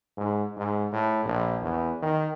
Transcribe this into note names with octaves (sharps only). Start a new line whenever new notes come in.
G#2
G#2
A2
A#1
E2
D#3